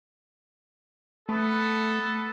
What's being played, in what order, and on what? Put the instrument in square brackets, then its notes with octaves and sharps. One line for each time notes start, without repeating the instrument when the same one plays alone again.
[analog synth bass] A3 [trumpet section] B3 A4